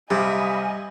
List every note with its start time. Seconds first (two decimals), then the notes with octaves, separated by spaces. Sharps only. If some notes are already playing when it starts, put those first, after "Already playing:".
0.11 C3 G3 D#5 F5 G#5 B5 D#6